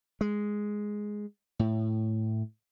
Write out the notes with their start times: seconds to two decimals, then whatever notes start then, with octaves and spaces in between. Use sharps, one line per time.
0.21 G#3
1.59 A2